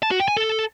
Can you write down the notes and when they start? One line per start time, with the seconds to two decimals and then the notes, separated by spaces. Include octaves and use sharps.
0.03 A5
0.11 F#4
0.20 G5
0.28 G#5
0.37 A4